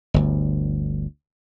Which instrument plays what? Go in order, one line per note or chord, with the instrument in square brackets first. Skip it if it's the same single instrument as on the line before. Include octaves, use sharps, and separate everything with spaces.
[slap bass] G1 D2